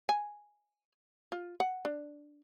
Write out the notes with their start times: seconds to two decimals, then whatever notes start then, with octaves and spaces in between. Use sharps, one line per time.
0.09 G#5
1.32 F4
1.60 F#5
1.85 D4